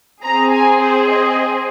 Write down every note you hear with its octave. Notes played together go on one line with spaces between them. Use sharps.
C4 G#4 A#5
G#5
C5
D#5